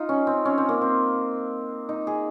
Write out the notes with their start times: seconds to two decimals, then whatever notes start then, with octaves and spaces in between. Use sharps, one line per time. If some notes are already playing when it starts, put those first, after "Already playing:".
Already playing: D#4 F4
0.09 C#4
0.27 C4
0.45 C#4
0.58 C4
0.69 A#3
0.81 C4
1.89 D#4
2.07 G#4